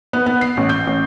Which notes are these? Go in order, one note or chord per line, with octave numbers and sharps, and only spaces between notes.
B3
B3
C7
A1
G6
A1